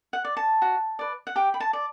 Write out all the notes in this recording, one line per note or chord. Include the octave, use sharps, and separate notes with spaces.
F#5
D5
A5
F#4
B4 D5
F#5
G4 G5
B5
A5
D5